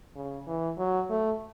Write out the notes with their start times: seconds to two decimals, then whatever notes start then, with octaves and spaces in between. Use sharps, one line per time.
0.15 C#3
0.47 E3
0.78 F#3
1.10 A3